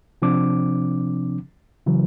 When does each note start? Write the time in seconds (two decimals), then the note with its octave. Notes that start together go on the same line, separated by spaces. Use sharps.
0.22 C3 F3 C4 D4 D6
1.86 C#3 E3 F#3